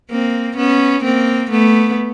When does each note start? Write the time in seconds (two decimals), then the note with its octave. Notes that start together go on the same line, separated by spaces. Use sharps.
0.11 A#3 C4
0.57 B3 C#4
1.04 A#3 C4
1.51 A3 B3